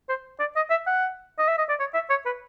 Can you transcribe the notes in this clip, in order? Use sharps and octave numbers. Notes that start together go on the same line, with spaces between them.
C5
D5
D#5
E5
F#5
D#5
E5
D#5
D5
C#5
E5
C#5
B4